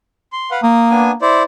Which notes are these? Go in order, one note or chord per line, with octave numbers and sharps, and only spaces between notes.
C6
B4 F5 F#5
A#3 D#6
B3 D4 G#5
E4 C5 D5